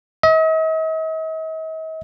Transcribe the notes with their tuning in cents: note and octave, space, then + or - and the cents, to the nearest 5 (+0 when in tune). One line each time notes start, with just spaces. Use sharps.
D#5 +45